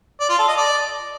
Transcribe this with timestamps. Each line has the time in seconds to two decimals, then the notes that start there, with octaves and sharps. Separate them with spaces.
0.20 D5
0.30 F4
0.39 A4
0.48 D#5
0.57 D5